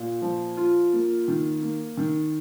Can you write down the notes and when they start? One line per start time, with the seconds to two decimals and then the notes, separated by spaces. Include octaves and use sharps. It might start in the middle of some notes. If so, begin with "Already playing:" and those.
Already playing: A#2
0.22 F3
0.57 F4
0.93 A#3
1.28 D#3
1.62 A#3
1.97 D#3